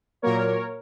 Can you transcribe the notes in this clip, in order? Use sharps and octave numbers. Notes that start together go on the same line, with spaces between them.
A#2 F#3 A#3 A#4 C#5